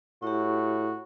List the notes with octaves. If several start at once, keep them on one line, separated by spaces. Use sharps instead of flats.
A2 E4 F#4 G4